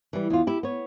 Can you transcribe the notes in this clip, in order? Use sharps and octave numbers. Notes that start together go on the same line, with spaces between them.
E3 G3
E2 F4
E4 G4
B3 C#5